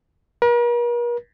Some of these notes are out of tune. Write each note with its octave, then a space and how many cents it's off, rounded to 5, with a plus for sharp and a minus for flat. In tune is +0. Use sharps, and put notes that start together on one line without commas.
A#4 +45